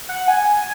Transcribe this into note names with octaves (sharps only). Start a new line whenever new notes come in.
F#5
G#5